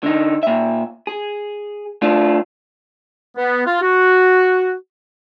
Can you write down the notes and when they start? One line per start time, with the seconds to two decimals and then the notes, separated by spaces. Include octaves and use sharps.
0.03 D3 D#4
0.43 A#2 E5
1.07 G#4
2.02 A3 D4 F4
3.37 B3
3.66 F4
3.81 F#4